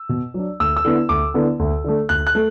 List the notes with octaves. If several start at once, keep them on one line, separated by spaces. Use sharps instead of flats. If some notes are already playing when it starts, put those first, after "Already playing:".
Already playing: E6
B2
F#3 D4
D2 E6
E6
D3 B3 E4
D2 D6
D3 B3 E4
D2
D3 A3
D2 F#6
F#6
A3